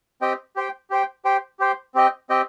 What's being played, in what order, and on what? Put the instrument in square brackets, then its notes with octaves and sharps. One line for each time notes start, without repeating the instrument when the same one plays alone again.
[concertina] C4 G4 D#5 G5
G4 C5 G5
G4 C5 G5
G4 C5 G5
G4 C5 G5
C4 G4 D#5 G5
C4 G4 D#5 G5